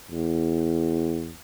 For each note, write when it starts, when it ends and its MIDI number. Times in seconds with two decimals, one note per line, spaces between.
0.11 1.33 40